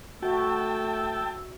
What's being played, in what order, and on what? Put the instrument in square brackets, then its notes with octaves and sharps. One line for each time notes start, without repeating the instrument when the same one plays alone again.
[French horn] A3 [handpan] F#4 E5 [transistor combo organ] G5 A5 [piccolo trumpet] E6